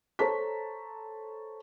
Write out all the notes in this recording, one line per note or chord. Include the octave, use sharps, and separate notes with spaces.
A4 C5 C#5 A5 A#5 B6